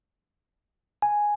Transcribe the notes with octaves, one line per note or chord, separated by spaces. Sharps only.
G#5